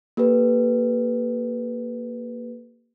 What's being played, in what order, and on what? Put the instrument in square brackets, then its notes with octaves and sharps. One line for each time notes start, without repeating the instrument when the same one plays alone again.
[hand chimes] A#3 G4 A4 B4